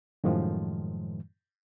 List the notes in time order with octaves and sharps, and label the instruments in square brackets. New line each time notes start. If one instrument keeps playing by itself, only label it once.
[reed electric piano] F#2 A2 D#3 F3 G#3